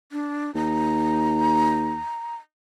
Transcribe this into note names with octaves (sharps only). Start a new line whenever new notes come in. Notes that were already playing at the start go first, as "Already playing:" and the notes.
D4
D#2 A#5